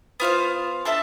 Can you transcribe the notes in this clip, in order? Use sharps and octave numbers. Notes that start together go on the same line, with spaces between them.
B3 F4 C5 F5
D4 A4 E5 A5